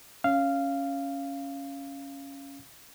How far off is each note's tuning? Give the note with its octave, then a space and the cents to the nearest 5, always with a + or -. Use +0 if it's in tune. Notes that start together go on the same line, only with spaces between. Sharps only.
C#4 +0 F5 -10